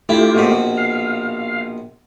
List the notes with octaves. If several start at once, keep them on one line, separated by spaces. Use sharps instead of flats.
A3 D4 E4 F4 G4
A#1 B2 C4
F5